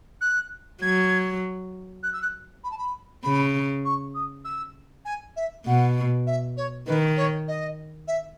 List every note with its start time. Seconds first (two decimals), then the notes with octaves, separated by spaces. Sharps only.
0.21 F#6
0.82 F#3 G#6
2.03 F#6
2.13 E6
2.22 F#6
2.64 B5
2.71 A5
2.78 B5
3.24 C#3 B5
3.85 C#6
4.15 D#6
4.45 E6
5.05 G#5
5.36 E5
5.66 B2 F#5
6.27 E5
6.57 C#5
6.87 D#3 B4
7.17 C#5
7.48 D#5
8.08 E5